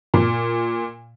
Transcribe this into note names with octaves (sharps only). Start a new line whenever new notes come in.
A#2